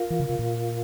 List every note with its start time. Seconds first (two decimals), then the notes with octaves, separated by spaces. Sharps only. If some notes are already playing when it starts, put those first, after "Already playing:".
Already playing: F4 A#4 F5
0.10 E3
0.19 C#3
0.29 C3
0.39 A#2